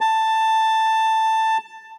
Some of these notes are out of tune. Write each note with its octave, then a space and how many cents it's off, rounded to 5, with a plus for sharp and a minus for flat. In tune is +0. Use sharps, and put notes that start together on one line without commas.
A5 +10